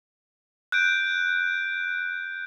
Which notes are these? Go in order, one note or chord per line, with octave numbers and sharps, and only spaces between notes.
F#6 G6 D7